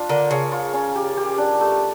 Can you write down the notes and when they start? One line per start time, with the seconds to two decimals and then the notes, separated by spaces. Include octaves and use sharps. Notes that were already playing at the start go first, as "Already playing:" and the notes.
Already playing: D4 F4
0.09 D3 A#4
0.30 C#3 C#5
0.52 F4
0.73 C#4
0.96 G4
1.17 G4
1.38 D4
1.61 A3